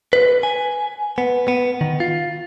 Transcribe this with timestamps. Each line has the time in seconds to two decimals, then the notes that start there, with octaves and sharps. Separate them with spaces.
0.13 B4
0.43 G#5
1.18 B3
1.48 B3
1.81 D#3
2.00 F4